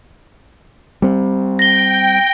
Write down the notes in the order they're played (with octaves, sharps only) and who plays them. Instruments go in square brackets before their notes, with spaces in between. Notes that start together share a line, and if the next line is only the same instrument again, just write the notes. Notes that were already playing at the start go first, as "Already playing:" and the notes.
[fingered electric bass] G3 C4
[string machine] G5 [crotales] A#6 G7